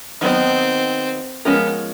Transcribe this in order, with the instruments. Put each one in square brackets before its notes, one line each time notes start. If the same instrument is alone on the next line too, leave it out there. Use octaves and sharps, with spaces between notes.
[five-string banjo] D#3 F#3 B3 D#4 [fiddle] C4
[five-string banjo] F3 G#3 C#4 F4 A#4 [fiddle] B3